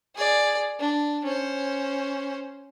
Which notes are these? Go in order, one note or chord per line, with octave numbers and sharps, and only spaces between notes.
G#4 D5
D4
C#4 C5